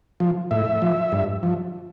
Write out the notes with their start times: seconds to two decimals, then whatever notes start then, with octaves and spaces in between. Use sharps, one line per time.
0.20 F3
0.51 A2 E5
0.82 F3
1.12 G2
1.43 F3